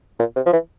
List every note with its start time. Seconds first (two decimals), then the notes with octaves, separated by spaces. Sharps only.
0.19 A#2
0.36 C3
0.46 F3
0.53 E3